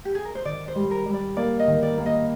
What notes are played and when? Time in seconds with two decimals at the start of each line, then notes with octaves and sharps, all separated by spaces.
0.05 G4
0.15 G#4
0.25 A#4
0.35 C5
0.45 D#3 D5
0.68 C5
0.76 G3
0.91 A#4
1.06 G3
1.14 D5
1.37 A#3 D5
1.59 D#5
1.68 D#3
1.83 D5
1.98 A#3
2.06 D#5